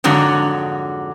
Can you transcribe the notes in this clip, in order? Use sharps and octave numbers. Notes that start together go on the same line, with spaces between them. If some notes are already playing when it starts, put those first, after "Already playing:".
F2 G#2 D3 F#3